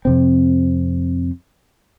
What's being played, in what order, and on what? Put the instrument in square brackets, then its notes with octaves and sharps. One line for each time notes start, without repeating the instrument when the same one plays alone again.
[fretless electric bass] F2 C3 C4